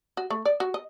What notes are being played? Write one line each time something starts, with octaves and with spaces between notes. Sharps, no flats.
F#4
A3
D5
F#4
D#5